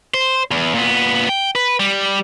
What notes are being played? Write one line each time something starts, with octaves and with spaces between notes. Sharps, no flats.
C5
E2
A#2 B3
G5
B4
G3